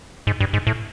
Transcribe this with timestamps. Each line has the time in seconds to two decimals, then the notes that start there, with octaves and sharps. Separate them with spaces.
0.27 G#2
0.40 G2
0.53 G#2
0.67 A2